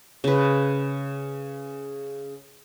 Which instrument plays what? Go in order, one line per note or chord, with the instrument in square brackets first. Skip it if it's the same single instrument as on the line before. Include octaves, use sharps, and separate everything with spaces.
[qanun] C#3 B4